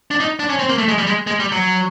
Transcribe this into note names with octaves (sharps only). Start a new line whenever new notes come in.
D4
D#4
D4
C#4
C4
A#3
A3
G#3
G3
G#3
G#3
G3
F#3